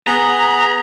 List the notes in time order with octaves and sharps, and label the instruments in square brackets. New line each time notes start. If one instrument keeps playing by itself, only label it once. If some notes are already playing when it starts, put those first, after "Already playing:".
[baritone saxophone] B3 [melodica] G#4 [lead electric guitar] A#5